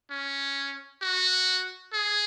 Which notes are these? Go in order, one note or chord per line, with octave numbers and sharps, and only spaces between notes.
C#4
F#4
G#4